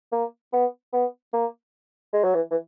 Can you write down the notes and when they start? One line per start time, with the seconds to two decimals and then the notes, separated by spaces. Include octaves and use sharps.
0.12 A#3
0.53 B3
0.93 B3
1.33 A#3
2.13 G#3
2.24 F#3
2.35 E3
2.51 E3